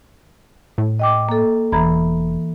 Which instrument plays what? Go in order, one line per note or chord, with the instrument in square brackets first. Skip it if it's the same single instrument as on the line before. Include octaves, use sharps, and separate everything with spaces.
[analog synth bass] A2
[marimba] D#5 G5 D6
A#3 A4
[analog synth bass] E1 [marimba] E3 A#5 B5